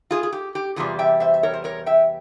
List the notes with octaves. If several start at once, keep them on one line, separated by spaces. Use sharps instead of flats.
F4 G#4
G#4
G4
G4
E2 C3 G3 F4 G#4
E5 G5
C5 E5
E5
A#4 C#5
C5
A#4 C#5
E5 G5